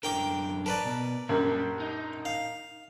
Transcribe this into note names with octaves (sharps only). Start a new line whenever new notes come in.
F#2 D3 A#4 G5 D6
A#4 B4 D5 A5
B2
A#1 F#2 G3
D#4
F5